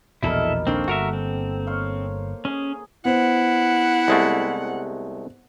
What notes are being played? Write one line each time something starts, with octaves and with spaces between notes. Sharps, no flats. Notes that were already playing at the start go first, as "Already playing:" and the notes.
A#1 E2 B2 G3 D#4 E4 A4 A#4
A#1 D#2 A#3 C4 D4 A4 C#6
G1 F#4 A#4 E5 F#5
C4
C5 C#5 F5
C#4 G#4
B3 E4 C5 F#5
C2 G#3 A3